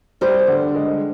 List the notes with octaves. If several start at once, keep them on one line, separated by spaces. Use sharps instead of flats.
G3 A#4 C5
D3
G#3